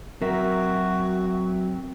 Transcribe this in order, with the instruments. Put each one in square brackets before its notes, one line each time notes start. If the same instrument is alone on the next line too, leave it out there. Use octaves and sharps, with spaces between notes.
[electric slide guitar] F#3 E5 [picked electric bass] C4 [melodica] F#4 [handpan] A#4